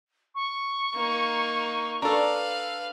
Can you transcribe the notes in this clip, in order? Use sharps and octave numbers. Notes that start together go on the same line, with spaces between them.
C#6
A#3 D#4
D4 A4 B4 F5 A#5